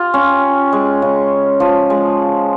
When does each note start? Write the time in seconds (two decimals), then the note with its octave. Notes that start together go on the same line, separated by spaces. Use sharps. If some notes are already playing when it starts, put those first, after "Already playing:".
Already playing: F4 G4
0.14 C#4
0.73 G#3
1.02 C#3
1.60 F3
1.90 G#3